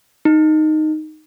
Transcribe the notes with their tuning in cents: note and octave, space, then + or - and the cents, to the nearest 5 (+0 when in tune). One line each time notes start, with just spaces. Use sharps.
D#4 -5